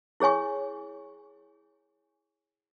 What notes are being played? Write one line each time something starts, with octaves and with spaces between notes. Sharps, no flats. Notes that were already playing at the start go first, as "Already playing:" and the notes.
E4 G#4 C#5 G#5 C#6